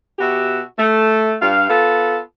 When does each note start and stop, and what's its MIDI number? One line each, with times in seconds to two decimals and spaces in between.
0.19 0.61 47
0.19 0.61 66
0.19 0.61 67
0.19 0.61 76
0.78 1.36 57
1.42 1.67 43
1.42 1.67 77
1.69 2.18 59
1.69 2.18 65
1.69 2.18 69